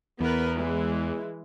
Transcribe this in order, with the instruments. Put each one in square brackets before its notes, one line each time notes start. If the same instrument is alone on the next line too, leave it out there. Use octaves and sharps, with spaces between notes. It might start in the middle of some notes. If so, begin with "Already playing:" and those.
[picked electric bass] E2 [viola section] B3 A#4 B4
[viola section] E3 G#3